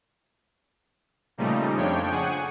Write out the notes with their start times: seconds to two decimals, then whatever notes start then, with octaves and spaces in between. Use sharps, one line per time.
1.38 A#2 C#3 F3 G3 A3 D#4
1.75 F2 F3 D4 C#5 G5
2.10 G#4 F#5 G#5 C#6